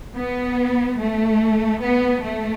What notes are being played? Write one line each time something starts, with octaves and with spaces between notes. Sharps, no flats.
B3
A3
B3
A3